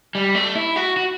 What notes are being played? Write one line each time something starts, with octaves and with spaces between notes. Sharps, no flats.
G3
A3
E4
F#4
F#4